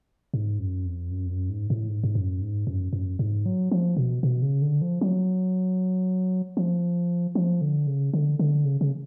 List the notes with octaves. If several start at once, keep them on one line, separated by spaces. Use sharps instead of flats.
G#2
F#2
F2
F#2
F2
F#2
G#2
A2
G#2
G#2
F#2
G#2
F#2
F#2
G#2
F#3
F3
B2
B2
C#3
D3
F3
F#3
F3
F3
D3
C#3
D3
D3
C#3
C#3